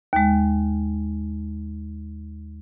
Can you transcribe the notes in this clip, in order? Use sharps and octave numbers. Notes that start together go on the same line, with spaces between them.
D#2 G#3